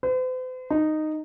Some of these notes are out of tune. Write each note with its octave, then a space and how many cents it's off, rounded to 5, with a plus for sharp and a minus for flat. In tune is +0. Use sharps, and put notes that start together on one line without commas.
C5 -45
D#4 -10